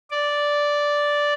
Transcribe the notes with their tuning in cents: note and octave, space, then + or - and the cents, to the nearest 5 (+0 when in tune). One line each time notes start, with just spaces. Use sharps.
D5 -5